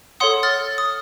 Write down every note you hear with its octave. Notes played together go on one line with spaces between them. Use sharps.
A4 C#5 F#5 C6 D#6
F6 A6
D#6